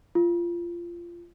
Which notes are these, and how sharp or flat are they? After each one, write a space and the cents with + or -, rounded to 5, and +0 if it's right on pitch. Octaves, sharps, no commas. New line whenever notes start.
F4 -20